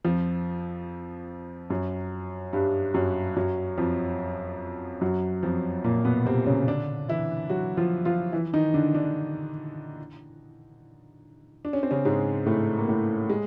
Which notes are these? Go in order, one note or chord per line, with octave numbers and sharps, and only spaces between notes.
F2 F3
F#2 F#3
G2 G3
F#2 F#3
F#2 F#3
F2 F3
F#2 F#3
F2 F3
A#2 A#3
B2 B3
C3 C4
C#3 C#4
D3 D4
E3 E4
F#3 F#4
F3 F4
F3 F4
E3 E4
D#3 D#4
D3 D4
D3 D4
D4
C#4
C4
C#3 C#4
G#2 G#3
A2 A3
A#3
A2 A3
G#3